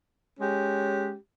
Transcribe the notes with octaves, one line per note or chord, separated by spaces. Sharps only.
G#3 C#4 G4